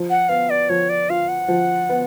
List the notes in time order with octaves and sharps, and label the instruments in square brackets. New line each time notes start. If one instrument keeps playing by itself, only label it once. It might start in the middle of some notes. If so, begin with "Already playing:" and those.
Already playing: [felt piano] F3
[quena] F#5
[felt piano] B3 [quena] F5
[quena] D5
[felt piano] F3 [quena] C#5
[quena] D5
[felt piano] F4 [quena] F5
[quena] F#5
[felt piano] F3
B3